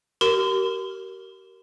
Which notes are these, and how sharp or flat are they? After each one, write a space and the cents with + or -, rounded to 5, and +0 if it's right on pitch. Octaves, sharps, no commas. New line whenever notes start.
G4 -40 A#4 +0 C6 -40